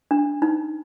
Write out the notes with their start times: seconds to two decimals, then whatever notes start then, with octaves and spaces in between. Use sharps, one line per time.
0.11 D4
0.42 D#4